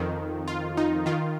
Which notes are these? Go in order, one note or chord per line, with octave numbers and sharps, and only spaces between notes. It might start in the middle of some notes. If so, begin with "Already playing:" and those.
Already playing: F2 D#3
F4
D#4
D#3 F4